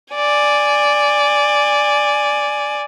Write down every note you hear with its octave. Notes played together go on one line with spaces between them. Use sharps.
D5 G#5